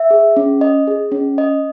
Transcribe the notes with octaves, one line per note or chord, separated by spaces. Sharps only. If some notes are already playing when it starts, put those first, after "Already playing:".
Already playing: E5
G#4
C#4
D#5
G#4
C#4
D#5